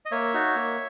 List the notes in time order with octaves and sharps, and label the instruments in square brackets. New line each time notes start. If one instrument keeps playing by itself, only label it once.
[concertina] D#5
A#3 C#5 E5
D#4 F#4
A#3